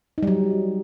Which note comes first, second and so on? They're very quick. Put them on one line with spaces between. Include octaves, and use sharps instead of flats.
D#4 G3 F#3